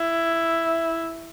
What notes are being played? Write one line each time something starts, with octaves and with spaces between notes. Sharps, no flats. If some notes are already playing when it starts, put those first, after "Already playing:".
Already playing: E4